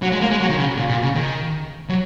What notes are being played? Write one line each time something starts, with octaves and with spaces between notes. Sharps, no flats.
F#3
G#3
A#3
G#3
F#3
D#3
C#3
A#2
A#2
C#3
D#3
F#3